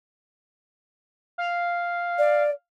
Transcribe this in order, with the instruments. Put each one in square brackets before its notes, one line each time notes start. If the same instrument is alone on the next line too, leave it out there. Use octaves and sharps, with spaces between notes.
[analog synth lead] F5
[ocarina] D5